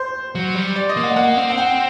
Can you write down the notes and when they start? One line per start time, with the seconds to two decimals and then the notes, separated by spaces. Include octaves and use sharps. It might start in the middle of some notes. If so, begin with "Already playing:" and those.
Already playing: C5
0.35 F#3
0.55 G3
0.76 D5
0.89 D#5
0.97 A#3
1.03 F#5
1.16 A#3 F#5
1.37 C4
1.50 F#5
1.58 G5